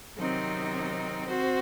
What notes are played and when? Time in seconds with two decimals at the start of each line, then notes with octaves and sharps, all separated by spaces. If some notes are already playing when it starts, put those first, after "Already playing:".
0.18 C3 D#3 F#3 C4 D#4
1.28 C4 F#4 C5